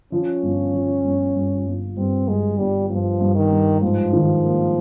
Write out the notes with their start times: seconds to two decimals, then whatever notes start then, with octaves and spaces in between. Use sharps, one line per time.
0.12 F3 C#4
0.43 G1
0.74 F3
1.04 G1
1.35 G2
1.66 G1
1.97 G2 C4
2.28 G2 G#3
2.58 G1 G3
2.90 G2 F3
3.20 G2
3.35 D#3
3.51 G2
3.81 G#2 F3
4.13 D#3
4.44 A#3